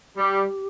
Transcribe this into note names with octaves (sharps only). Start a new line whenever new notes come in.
G3 G4